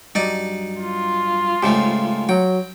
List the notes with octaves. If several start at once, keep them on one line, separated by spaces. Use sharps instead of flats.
G2 F#3 D#4 D5 D#5
F4
G#2 C#3 A3 G4
F#3 F#4 G5